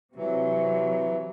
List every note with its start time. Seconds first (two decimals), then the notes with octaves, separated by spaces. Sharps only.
0.16 C3 E3 F#3